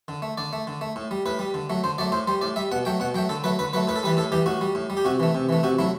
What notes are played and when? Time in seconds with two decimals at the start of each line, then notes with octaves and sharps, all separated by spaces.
0.08 D3
0.22 A3
0.38 D3 D5
0.53 A3
0.67 D3
0.81 A3
0.96 A2
1.11 G3
1.26 A2 B4
1.39 G3
1.54 D3
1.70 F#3 A3
1.84 D3 C5
1.98 F#3 A3 D5
2.12 A2 C5
2.27 G3 C5
2.41 A2 D5
2.56 G3 E5
2.72 B2 F#5
2.85 F#3 A3 G5
3.00 B2 F#5
3.14 F#3 A3 G5
3.29 D3 A4
3.44 F#3 A3 B4
3.59 D3 B4
3.73 F#3 A3 B4
3.88 A2 B4
3.96 A4
4.03 E3 G3 B4
4.17 A2 A4
4.32 E3 G3 G4
4.46 A2 F#4
4.61 G3
4.75 A2
4.90 G3
4.97 G4
5.05 C3 F#4
5.20 E3 A3
5.35 C3
5.49 E3 A3
5.63 C3 F#4
5.79 F#3 A3 E4